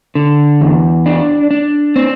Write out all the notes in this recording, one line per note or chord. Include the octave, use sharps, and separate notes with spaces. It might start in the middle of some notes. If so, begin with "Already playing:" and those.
D3
E2
D4
D4
C4